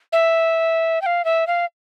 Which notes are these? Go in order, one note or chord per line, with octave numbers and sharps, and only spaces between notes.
E5
G5
F5
E5
F5